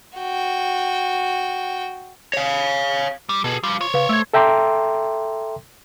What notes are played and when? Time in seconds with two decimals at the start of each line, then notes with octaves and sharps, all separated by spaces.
0.18 F#4 G5
2.34 C#5 F5
3.29 G3
3.44 B2 G#4 A4
3.63 F3 G3 F4
3.81 C5 C#5
3.94 C#3 B4 F5
4.09 A3 E6 G#6
4.34 A4 E5 G5 A#5 C6 D6